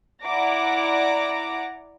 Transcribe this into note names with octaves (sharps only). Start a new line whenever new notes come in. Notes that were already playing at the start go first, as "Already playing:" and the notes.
E4 D5 F#5 A#5 D6 A#6